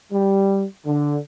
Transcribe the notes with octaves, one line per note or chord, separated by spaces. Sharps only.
G3
D3